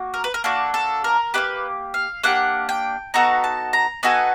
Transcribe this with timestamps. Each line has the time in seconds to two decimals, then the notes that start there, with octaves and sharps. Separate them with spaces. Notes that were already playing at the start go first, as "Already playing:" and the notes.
Already playing: A#3 F#4
0.14 A#4
0.24 B4
0.34 A#4
0.44 A#3 D4 F#4 A4
0.74 A4
1.04 A#4
1.34 A#3 D4 G4 B4
1.94 F5
2.24 A#3 D4 G4 F#5
2.69 G5
3.14 B3 D#4 F#4 A4 A#5
3.44 A5
3.73 A#5
4.03 B3 D#4 F#4 A4 G#5